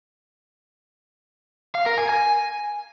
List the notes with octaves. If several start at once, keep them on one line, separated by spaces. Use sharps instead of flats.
F5
A#4
G#5
G#5